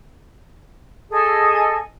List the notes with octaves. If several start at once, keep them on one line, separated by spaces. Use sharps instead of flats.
G#4 A4 D#5 G#5